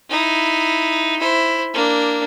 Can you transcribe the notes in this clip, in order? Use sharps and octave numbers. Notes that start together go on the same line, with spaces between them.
D#4 E4
E4 C5
A#3 D4